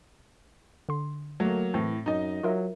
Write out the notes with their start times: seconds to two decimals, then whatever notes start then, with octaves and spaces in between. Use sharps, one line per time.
0.89 D3 C6
1.40 F#3 A3 A#3
1.74 A2 E3 C4
2.06 F#2 D#4 D#5
2.43 F#3 F4 A#4 E5